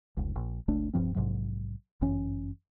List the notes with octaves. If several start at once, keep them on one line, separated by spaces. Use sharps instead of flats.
F1 C#2
A#1
F#1 C#2 A3 D4
D1 G2 F3 C4
A#1 G#2 C3 F#3
G1 F#2 E3 C#4